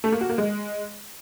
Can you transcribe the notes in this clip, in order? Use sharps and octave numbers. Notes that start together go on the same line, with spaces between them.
A3
A#3
F#4
A#3
G#3